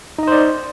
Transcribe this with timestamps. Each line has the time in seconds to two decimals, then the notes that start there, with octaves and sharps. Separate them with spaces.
0.19 D#4
0.23 D#5
0.28 C5
0.32 D5